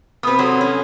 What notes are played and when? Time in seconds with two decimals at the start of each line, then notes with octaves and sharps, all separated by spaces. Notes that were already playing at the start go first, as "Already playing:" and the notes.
0.23 C3 B3 B4 D#6
0.39 F#3 A4 C#5 C6
0.61 C#4